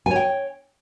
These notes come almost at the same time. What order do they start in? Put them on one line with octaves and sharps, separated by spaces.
G#5 C#5 G5